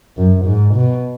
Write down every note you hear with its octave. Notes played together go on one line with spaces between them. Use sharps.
F#2
G#2
B2